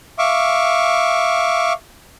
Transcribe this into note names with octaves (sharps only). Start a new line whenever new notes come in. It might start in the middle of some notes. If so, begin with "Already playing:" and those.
E5 F5 C#6 D6